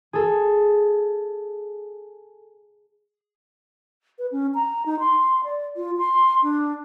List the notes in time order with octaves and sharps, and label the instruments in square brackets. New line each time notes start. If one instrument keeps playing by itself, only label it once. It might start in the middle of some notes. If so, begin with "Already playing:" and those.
[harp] G#4 A4
[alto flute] B4
C#4
A#5
D#4
C6
D5
F4
C6
D4